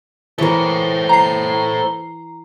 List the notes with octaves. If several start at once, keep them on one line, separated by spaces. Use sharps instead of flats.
E3 A4 A#4 C5 C#5
A#5 C7